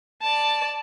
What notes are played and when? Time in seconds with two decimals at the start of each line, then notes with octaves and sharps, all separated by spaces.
0.22 D5 A5